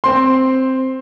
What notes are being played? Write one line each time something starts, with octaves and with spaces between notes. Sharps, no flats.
C4 C6